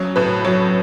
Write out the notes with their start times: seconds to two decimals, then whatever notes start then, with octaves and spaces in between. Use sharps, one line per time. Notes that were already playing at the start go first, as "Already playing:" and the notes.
Already playing: C#3 F#3 C#5
0.16 A2 B4
0.44 F#3 C#5